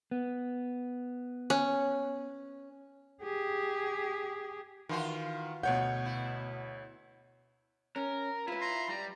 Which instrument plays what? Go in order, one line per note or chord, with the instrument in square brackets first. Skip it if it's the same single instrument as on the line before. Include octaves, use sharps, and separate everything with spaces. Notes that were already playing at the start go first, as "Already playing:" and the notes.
[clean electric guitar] B3
[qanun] C#4
[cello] G4 G#4
[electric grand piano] D#3 C6 [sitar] E3 F4 F#4
[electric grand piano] D2 C#5 G6 [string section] B2 [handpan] F#5
[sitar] E4
[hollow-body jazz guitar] C#4 [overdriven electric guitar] A#4
[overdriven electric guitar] E4 [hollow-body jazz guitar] F4 B4
[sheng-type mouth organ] A#5 C6
[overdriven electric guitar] G3 [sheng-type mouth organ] A#5